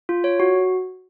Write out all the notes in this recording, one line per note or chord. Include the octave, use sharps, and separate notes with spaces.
F4
C#5
F#4